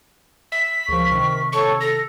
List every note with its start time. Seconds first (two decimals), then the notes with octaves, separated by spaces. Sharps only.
0.52 E5 B6
0.89 C#2 F3 A#4 C#6
1.12 C3 D#3
1.53 A4 C#5 A5 C#6
1.80 A4 A#6